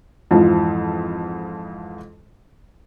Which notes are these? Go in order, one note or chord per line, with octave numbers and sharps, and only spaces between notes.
F2 G#2 E3 F3